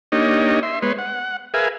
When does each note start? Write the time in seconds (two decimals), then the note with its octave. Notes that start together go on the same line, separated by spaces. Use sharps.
0.12 A#3 D4 D#4 G4 C#5 D#5
0.63 E5 C6
0.82 G#3 B3 B4 C#5 C6
0.98 F#5
1.54 G#4 A#4 B4 E5 F5 G#5